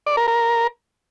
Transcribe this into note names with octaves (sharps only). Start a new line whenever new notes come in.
D5
A#4
A#4